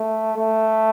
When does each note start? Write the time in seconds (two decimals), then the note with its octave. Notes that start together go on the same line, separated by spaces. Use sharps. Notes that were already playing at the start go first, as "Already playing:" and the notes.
Already playing: A3
0.37 A3